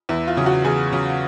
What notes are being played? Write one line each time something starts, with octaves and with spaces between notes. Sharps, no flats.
E2 E4
F4
C#3 F#3
F#4
E2 G#4
C#3 F#3